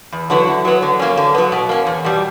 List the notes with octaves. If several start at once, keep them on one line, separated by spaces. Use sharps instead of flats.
E2
D3 F#3 B3 E4
D3
F#3 B3
D3
F#3 A#3 C#4
D3
F#3 B3
B2
A#3 C#4
E2
B2 G3